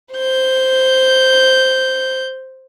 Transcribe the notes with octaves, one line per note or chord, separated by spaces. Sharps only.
C5 G6